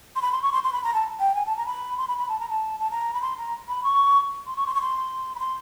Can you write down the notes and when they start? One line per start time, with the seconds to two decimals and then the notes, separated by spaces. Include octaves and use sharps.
0.16 C6
0.22 B5
0.32 C6
0.42 C#6
0.52 C6
0.63 C6
0.73 B5
0.84 A#5
0.94 A5
1.20 G5
1.35 G#5
1.46 A5
1.57 A#5
1.66 B5
1.98 C6
2.08 B5
2.18 B5
2.29 A5
2.39 A#5
2.49 A5
2.80 A5
2.91 A#5
3.14 B5
3.22 C6
3.37 A#5
3.69 B5
3.84 C#6
4.47 C6
4.56 C#6
4.67 C6
4.75 C#6
4.81 C6
5.35 B5
5.40 C6